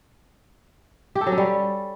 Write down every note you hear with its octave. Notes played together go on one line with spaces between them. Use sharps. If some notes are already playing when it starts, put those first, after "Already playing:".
G4
A4
F#3
C#4
G3